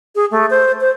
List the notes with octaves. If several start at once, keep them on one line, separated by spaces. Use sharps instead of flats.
G#4
A3
C5
C5